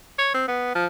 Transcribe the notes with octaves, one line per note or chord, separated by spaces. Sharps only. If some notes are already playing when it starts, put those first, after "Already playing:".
C#5
C4
B3
F3